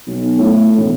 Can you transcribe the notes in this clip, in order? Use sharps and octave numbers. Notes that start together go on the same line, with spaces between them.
B1
A2
E1